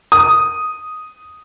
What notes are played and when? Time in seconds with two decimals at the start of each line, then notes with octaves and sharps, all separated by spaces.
0.12 D#6